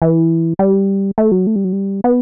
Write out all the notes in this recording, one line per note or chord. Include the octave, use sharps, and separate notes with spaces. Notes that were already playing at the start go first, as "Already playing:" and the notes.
E3
G3
A3
F#3
A3
G3
F#3
G3
B3